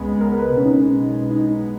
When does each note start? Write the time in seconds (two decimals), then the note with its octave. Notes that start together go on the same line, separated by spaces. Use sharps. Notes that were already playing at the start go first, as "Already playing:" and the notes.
Already playing: C#2 C#3 G#3 B3
0.21 A#4
0.39 B4
0.57 B1 B2 G#3 B3 C#4
0.65 D#4
0.73 C#4
1.31 D#4